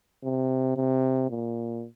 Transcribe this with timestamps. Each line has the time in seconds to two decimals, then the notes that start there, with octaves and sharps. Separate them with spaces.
0.24 C3
0.77 C3
1.30 A#2